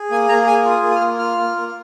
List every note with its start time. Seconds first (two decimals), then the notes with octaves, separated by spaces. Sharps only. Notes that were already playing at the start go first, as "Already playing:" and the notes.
Already playing: G#4
0.11 A#3 G#5
0.29 A#3 A#5
0.47 G#4 G#5
0.65 F4
0.71 D#6
0.83 A#3
0.91 D#6
0.96 F6
1.01 A#3
1.19 F4 F6
1.37 A#3
1.56 A#3